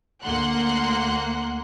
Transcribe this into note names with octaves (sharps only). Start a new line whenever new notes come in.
D2 A#3 F#5 C6 F#6